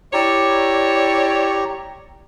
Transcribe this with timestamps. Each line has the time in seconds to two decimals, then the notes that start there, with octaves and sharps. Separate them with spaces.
0.13 E4 G4 C#5 D5 A#5